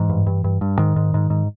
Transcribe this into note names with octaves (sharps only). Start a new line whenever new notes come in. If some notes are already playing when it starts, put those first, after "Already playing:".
Already playing: G#2 E3
G2
G2
G2
G2
G#2 D#3
G#2
G#2
G#2